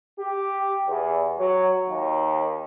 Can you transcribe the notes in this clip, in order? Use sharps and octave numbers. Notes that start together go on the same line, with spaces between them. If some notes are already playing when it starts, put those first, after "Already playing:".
G4
E2
F#3
D#2